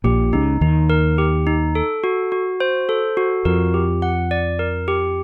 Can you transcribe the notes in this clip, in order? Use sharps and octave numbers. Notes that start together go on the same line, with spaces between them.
A#1 A#2 G4
C#2 C#3 D#4
D#2 D#3 D#4
A#4
G4
D#4
A4
F#4
F#4
C5
A4
F#4
F2 F3 A#4
G4
F#5
D5
A#4
G4